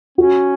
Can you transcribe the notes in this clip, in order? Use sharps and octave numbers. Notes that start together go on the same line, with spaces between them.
C#4 F#4